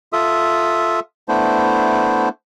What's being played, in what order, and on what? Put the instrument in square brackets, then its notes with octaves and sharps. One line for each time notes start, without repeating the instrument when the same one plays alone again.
[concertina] F4 A4 E5 D#6
A3 B3 D4 E4 C5